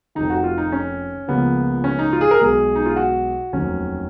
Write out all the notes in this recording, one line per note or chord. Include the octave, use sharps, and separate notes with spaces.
F1 F2 D#3 D#4
F#4
F4
D#4
C#4
C#2 C#3 F3 A#3 B3
C#4
D#4
F4
G#4
A#4
B1 B2 G#3 G#4
D#4
F4
F#4
F1 D#2 D#3 F#3 C#4